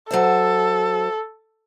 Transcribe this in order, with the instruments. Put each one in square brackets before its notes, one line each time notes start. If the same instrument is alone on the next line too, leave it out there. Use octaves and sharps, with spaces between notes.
[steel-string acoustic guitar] F#3 C5 E5 [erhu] A4